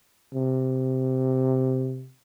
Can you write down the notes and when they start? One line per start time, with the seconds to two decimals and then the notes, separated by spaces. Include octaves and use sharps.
0.34 C3